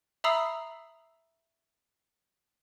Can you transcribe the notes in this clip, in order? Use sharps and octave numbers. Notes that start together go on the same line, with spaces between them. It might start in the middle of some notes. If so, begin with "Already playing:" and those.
E5 A#5 B5 D#6 E6 C7